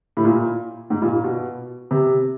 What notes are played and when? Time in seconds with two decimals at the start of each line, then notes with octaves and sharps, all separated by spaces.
0.17 A2
0.24 A#2
0.90 G#2
1.02 A#2
1.13 A#2
1.24 B2
1.91 C3